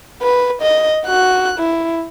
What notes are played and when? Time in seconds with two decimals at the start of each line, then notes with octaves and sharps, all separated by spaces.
0.22 B4
0.62 D#5
1.06 F#4 F#6
1.58 E4